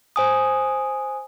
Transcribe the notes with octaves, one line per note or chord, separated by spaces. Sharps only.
C5 G#5 D#6